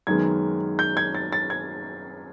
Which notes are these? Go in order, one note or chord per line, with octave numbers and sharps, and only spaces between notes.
F#2 D#3 G#3 B3 G#6
G6
G#6
A6
A6
G#6